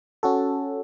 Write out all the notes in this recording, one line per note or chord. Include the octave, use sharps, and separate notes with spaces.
C#4 F#4 A4